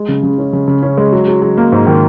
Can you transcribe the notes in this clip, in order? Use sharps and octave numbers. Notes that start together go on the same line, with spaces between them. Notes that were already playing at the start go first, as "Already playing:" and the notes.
Already playing: G#3
C#3
C#3
C#4
C#3
C#3
C#4
G#3
F#3
F#3
F#3
A#3
G#2
D#3